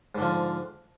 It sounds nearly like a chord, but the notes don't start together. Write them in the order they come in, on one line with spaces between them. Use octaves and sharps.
G#2 D3 F3